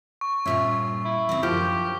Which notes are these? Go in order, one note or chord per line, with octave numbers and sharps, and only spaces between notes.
C#6
G2 A#2 C#4 F4 E5
E4
C#3 C4
F#2 D3 F3 G4